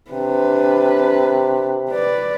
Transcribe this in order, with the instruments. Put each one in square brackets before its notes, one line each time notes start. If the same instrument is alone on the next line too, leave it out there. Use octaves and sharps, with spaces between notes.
[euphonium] C3 [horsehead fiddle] D4 B4
[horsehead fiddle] B4 D5